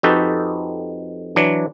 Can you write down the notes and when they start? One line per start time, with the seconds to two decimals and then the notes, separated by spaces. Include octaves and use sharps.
0.03 F2 D#4 F#4 G4 A4 B4
1.36 E3 F#3 D4